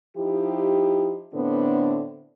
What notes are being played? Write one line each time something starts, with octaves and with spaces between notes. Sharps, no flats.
F3 D#4 E4 G4
A2 D3 B3 C4 D4